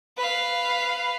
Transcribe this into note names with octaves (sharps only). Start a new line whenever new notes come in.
B4 F5